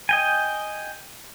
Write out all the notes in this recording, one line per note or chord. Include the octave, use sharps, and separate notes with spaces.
D#5 G5 G#5